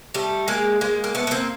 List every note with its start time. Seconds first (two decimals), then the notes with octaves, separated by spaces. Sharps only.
0.14 G3 A3
0.48 G#3 A#3
0.81 G#3 A#3
1.04 A#3
1.15 A3 B3
1.27 B3
1.31 A#3 C4